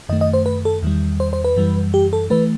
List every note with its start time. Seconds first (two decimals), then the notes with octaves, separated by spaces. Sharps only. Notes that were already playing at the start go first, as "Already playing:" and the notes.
0.09 F#2 D#3 A3 D#5
0.21 D#5
0.34 C5
0.46 B4
0.65 A4
0.83 E2 D#3 G3
1.20 C5
1.33 C5
1.44 B4
1.57 F#2 E3 G3
1.94 G4
2.13 A4
2.30 E3 A3 B4